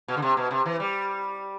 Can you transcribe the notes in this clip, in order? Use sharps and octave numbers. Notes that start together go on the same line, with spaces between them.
B2
D3
C3
B2
C3
E3
G3